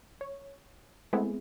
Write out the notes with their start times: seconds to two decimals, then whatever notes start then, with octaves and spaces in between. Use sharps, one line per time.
0.21 C#5
1.13 G#3 A3 B3 C4 E4 G#4